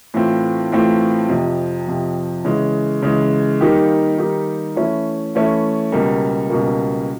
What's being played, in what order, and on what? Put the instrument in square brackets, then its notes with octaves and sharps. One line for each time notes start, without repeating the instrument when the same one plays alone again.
[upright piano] A2 E3 A3 C4 F4
A2 E3 A3 C4 F4
F2 C3 F3
F2 C3 F3
C#3 E3 G#3
C#3 E3 G#3
D#3 G3 A#3 D#4 G4
D#3 G3 A#3 D#4 G4
E3 A3 C#4 E4
E3 A3 C#4 E4
C#2 B2 G3 A#3
C#2 B2 G3 A#3